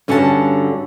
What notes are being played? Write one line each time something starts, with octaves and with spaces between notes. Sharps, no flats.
G2 D3 C#4 F#4 B4 A5